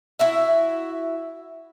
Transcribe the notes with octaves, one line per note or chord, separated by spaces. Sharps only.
E4 F#4 E5